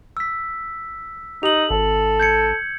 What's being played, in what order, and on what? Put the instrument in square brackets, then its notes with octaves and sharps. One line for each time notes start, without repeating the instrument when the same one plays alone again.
[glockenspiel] E6 B6
[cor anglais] D#4 [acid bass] G4 [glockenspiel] F7 F#7
[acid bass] G#1 [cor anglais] A4
[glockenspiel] G6 G#6 C#7